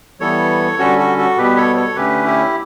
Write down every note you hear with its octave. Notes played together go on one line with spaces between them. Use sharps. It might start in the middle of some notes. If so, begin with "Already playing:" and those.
E3 G3 B3 A4 C#5
D3 G3 C#4 F#4 A4
F#4 A4
F#4 A4
B2 G3 B3 G4 B4
A4 C#5
A4 C#5
D3 A3 C#4 G4 B4
E4 G4